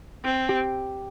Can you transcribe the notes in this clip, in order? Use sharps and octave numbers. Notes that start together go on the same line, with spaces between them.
C4
G4